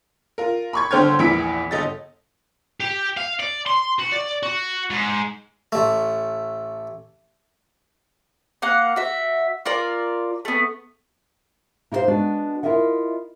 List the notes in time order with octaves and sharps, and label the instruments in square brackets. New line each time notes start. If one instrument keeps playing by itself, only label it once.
[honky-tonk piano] F4 A#4
B5 C#6 G#6
G1 D3 C5 G5 F6 G#6
A#1 E2 E3 B5 B6 D7
G1 D#5 A6
[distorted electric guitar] G4
F5
D5
C6
F#4
D5
F#4
G#2
[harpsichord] A1 A3
[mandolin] A#3 F5 F#5 F#6
F#4 E5
F4 A#4 D5 A#5
A3 B3
[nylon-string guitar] D#4 E4 G4 G#4 C5 F5
G#3 B3 D4 F#4
E4 F4 A#4 D#5 E5 F#5